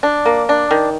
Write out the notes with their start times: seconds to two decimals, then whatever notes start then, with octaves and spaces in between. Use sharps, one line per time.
0.03 D4
0.26 A#3
0.49 D4
0.71 D#3